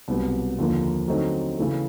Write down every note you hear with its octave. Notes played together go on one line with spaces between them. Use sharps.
C2 B2 F#3 B3
D#2 D3 F3 A#3
D3 F#3 A3 C4 D#4
C#3 E3 A3